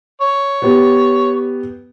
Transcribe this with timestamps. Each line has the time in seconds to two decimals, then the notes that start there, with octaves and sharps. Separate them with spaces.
0.21 C#5
0.62 B3 G4